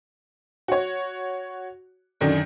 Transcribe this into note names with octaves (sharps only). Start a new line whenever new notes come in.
F#4 C#5
F#2 D3 D#3 D4 D#4